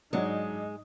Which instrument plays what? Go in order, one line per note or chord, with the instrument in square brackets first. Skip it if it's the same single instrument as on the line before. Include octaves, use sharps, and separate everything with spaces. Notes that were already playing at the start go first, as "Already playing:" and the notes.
[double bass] G#2 D#4 [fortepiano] F#3 D4 [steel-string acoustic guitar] G#3